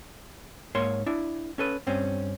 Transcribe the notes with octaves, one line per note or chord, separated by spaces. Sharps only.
G#2 A#3 C#5 C6
D4 E4
C#4 A4 B4
G2 C4 C#4